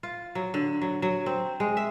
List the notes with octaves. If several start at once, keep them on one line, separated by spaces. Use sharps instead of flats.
F4
F#3
D3
F#3
F#3
C4
G#3
E5